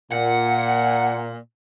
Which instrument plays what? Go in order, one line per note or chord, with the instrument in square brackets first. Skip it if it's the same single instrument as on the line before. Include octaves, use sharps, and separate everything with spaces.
[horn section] A#2 [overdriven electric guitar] F#5